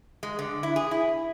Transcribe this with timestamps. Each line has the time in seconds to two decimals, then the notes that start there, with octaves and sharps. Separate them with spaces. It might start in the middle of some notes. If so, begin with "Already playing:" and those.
0.23 G#3
0.39 D3
0.63 E4
0.76 G#4
0.91 E4